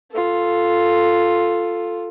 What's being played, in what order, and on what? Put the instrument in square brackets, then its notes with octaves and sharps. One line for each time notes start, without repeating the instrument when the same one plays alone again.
[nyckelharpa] F4 A4